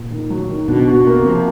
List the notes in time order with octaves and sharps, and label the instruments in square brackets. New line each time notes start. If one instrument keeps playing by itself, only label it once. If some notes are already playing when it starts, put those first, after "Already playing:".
Already playing: [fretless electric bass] A#2
[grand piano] D#3
F#3
D#3
[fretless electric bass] B2 [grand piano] D4
[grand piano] F#4
[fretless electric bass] B2
[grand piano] A#3
[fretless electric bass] C3
[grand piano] F3